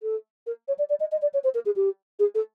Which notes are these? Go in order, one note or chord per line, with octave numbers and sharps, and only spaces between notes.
A4
A#4
C#5
D5
D5
D#5
D#5
D5
C#5
C5
A#4
G#4
G4
G#4
A4